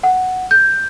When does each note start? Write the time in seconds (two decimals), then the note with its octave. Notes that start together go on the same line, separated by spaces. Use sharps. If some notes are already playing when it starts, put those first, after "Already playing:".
0.03 F#5
0.51 G6